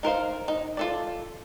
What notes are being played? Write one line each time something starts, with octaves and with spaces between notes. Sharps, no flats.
D#4 A#4 C5 F5
D#4
F4 A4 D5